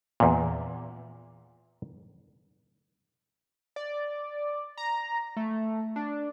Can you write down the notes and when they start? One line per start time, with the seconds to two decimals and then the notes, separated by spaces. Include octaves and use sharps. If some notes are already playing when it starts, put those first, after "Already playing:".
0.20 E2 A#2
3.76 D5
4.77 A#5
5.37 A3
5.96 D4